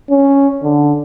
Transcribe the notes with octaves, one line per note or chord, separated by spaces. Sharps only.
C#4
D3